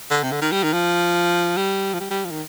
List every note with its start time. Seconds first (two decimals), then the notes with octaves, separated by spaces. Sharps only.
0.11 D3
0.23 C3
0.32 D3
0.42 D#3
0.52 G3
0.64 D#3
0.73 F3
1.57 G3
1.94 F3
2.00 G3
2.10 G3
2.25 F3
2.31 D#3